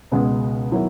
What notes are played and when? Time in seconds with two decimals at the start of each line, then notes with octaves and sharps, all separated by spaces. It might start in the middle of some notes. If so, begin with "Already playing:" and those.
0.12 C#2 B2 G#3 B3
0.72 D#3 F#3 B3 E4